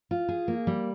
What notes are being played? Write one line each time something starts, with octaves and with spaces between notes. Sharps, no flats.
F4
G#4
A#3
G3